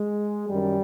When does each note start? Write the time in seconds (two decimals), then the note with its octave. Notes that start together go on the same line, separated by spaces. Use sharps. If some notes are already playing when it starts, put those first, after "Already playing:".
Already playing: G#3
0.48 F#2 D#3 G3